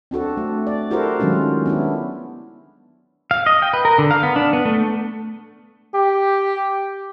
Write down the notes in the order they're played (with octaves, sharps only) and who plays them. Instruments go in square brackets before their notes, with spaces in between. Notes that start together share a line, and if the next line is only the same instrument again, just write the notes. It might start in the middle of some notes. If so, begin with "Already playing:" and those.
[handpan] C4 D4 F#4 A4
A3
D5
E4 F#4 G4 A4 A#4 C5
D#3 F#3 G#3 C#4 F4
B3 D4 E4
[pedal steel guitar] F5
D#5
G5
B4
A#4
D3
F5
B3
D4
B3
A3
[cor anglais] G4